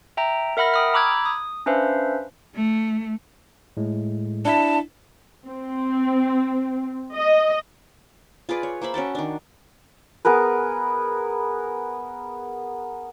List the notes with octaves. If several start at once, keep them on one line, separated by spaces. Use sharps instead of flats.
E5 G5 A#5
A#4 E5 F#5 B5 F6 A#6
G5 D#6 F6
A#5 B5 D6 E6 F#6 G#6
D#6
C#4 D4 B4 C5 E5 F5
A3
A2 G#3
D4 E4 A5 B6
C4
D#5
F4 G#4 B4 D5
C#5
A#3 C5 E5 B5
C#4 F#4 G5 A5
D#3 D4
B3 G#4 A#4 B4